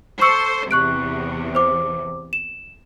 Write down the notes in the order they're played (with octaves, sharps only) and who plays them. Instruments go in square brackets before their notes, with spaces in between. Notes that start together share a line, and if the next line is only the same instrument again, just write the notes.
[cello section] A4 C5 [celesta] C#6 E6 C#7
[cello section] E2 C3 [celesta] C#6 F#6 D7
[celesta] C5 D6
E7